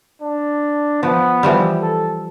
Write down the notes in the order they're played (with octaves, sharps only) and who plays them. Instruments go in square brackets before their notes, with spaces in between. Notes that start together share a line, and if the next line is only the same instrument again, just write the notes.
[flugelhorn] D4
[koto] F3 [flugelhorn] B3
[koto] E3 F3 G3
[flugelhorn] A4